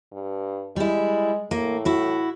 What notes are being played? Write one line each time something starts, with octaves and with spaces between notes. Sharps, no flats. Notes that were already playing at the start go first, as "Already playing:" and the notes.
G2
G3 G#3 E4
A2 A#3
E4 F#4